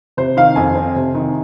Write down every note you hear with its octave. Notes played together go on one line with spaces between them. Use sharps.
C3 C5
D#3 F5
F2 G#5
C4
C3
D#3